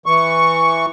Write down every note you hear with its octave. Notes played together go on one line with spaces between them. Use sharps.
E3 C#6